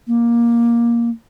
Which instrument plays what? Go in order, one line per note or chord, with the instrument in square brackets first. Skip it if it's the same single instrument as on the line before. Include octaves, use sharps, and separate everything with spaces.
[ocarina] A#3